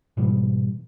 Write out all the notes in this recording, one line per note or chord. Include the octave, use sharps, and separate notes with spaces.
G#2 B2 E3 G3